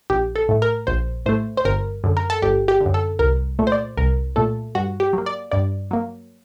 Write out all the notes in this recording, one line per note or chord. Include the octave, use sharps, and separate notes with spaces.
A#1 G4
A4
A2 A3
A#4
A#1 C5
A2 A3 C5
C5
G1 A#4
F#2 D3
A#4
A4
G1 G4
G4
D3
F#2
A4
C2 A#4
A#2 A3
C5
D5
C2 A#4
A#2 A3 A4
G2 F#4
G4
F#3 A#3
D5
G2 D5
F#3 A#3